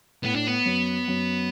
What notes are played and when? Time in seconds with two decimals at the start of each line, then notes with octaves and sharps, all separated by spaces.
0.24 A2 B3
0.36 D4
0.48 B3
0.66 F#2
1.08 F#2